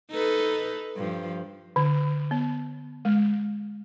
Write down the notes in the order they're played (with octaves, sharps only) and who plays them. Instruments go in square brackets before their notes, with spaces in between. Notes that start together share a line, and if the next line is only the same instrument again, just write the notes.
[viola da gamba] D#4 A4 B4
G2 F3
[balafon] D3
B3
G#3